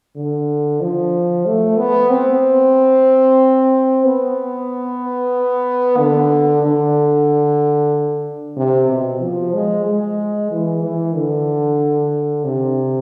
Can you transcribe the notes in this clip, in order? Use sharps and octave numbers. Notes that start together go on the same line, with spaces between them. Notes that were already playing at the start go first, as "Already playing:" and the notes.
D3
F3
A3
B3
C4
B3
D3
D3
C3
B2
F3
G#3
G#3
E3
E3
D3
C3